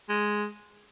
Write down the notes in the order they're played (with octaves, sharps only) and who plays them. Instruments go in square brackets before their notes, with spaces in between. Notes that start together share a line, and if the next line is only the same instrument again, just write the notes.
[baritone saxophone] G#3